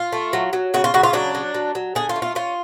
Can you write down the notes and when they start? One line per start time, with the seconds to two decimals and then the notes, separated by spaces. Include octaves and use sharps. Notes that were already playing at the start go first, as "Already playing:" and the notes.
Already playing: F4
0.12 A3
0.33 F#3
0.53 F#3
0.74 C#3 F#4
0.84 F4
0.94 C#3 F#4
1.03 F4
1.13 F#3 D4
1.35 F#3
1.54 F#3
1.75 F#3
1.95 D3 G#4
2.09 F4
2.16 A3
2.22 F4
2.35 C#4 F4